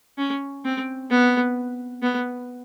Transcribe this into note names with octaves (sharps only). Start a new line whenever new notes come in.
C#4
C4
B3
B3